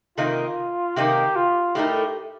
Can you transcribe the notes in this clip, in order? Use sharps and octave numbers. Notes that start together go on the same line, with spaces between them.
C3 D#3 A#3 D#4 F4
C3 D#3 A#3 D#4 G4
F4
A2 A3 D#4 G4 A#4